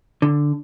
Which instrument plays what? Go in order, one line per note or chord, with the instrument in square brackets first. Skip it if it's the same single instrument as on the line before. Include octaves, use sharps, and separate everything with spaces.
[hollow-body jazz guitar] D3